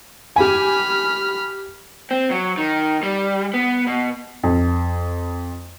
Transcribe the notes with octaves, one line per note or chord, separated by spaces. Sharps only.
G4 G#5 B5 F6
C4
F#3
D#3
G3
B3
B2
F2